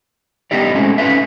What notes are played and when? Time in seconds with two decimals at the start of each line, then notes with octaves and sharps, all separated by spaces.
0.51 G3 B3 D4 D#4 G4 D5
0.74 G#3 A3 C4 C#4 F#4
0.98 C#4 D#4 F4 B4 E5